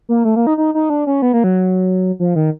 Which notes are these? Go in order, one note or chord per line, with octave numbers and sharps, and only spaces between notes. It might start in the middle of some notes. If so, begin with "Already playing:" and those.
A#3
A3
A#3
D#4
D#4
D#4
D4
C#4
B3
A#3
F#3
F3
D#3